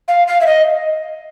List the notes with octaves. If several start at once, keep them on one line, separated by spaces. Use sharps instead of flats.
F5
F5
E5
D#5